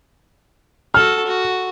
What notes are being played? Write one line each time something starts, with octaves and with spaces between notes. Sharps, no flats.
F#4 A4 F6
F#4